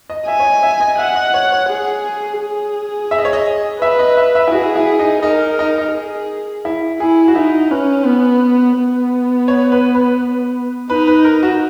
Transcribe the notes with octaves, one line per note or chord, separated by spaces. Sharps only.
D#5
E5 G#5
C#5
D#5
E5
D#5
E5 F#5
D#5
C#5
C#5
G#4
G#4
E5
D#5
C#5
D#5
B4 E5
D#5
E5
E5
E4
F#4 G#4
E4
D#4
D#4 A#4
D#4
D#4
G#4
E4
E4 G#4
F#4
D#4 E4
C#4 B4
B3
B3
C#5
B4
B4
D#4 B4
B4
A#4
F#4